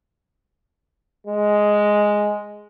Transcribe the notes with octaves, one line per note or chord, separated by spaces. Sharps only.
G#3